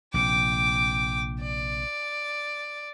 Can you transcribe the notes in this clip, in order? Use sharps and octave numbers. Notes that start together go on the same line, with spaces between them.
A#1 C3 G5 D6
D5